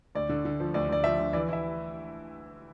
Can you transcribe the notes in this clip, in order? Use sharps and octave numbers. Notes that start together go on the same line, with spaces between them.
D2 D5
D3
D3
F3
D2 D5
D2 D5
F3 E5
D2
E3 D5
E4 E5